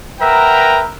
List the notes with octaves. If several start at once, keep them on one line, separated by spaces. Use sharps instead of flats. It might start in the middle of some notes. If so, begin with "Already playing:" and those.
A#4 B4 E5 F#5 G5 A#5